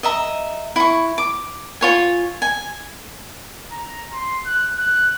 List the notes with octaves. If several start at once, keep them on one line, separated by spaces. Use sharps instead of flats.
D#5 E5 A#5
E4 C#6
D6
F4 C#5 G#5
G#5
A#5
C6
F#6
F#6